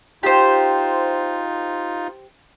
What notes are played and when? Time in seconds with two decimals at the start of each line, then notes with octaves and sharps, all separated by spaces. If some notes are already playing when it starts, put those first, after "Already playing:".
0.23 D#4 F4 G4 C5